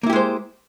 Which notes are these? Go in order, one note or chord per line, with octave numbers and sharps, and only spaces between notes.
G#3 A#3 E4 G4 C5